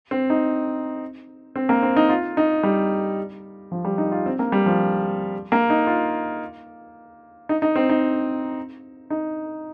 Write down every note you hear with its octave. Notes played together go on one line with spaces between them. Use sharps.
C4
D#4
C4
A#3
C4
D#4
F4
D#4
G3
F3
G3
D#4
F4
C4
A#3
G3
F3
A#3
D#4
F4
D#4
D#4
C4
D#4
D#4